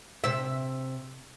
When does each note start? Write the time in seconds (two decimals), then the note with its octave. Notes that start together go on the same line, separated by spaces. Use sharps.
0.24 C3 E5